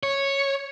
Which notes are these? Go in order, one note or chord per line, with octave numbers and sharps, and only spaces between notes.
C#5